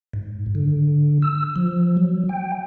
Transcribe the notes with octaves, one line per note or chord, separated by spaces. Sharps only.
G#2
D3
E6
F3
F#3
G5